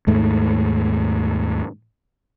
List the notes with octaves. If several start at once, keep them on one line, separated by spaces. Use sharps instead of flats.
D#2 G#2 A3